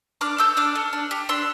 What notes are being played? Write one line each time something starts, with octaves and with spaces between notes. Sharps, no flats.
D4 D6 F6
A4 E6 G6
D4 D6 F6
A4
D4
G4
D4 C6 E6